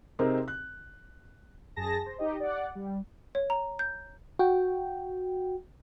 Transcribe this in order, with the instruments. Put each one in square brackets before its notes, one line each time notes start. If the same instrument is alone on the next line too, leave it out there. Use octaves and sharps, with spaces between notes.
[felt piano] C3 C4 D#4 G#4 A#4
F#6
[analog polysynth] F#2 G#4 A5 A#6
C5
D#4 G4 D#5
D5 F#5
G3
[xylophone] C#5
A#5
G6
[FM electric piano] F#4 G5